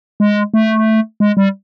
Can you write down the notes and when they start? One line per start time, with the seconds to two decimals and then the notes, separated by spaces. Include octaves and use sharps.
0.20 G#3
0.54 A3
1.20 G#3
1.37 G3